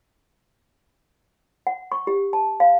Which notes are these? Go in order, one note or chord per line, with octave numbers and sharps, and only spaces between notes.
F#5
C#6
G4
A5
F5